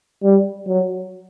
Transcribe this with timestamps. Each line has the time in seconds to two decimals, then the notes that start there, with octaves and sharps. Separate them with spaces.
0.23 G3
0.67 F#3